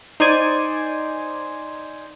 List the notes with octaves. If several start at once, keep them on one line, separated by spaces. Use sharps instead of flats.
D#4 C5 D5 G#5